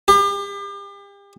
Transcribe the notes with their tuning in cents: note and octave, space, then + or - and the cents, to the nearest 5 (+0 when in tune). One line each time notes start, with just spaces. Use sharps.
G4 +40